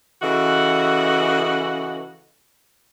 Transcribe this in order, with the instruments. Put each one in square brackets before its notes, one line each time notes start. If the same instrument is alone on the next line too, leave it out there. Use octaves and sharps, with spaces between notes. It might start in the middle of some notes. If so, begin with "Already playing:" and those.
[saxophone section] C#3 E3 F#4 A4 D#5